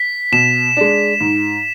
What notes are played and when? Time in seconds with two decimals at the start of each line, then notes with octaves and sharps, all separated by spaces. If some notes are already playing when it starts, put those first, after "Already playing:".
Already playing: B6
0.32 B2 E7
0.77 G#3 D4
1.21 G#2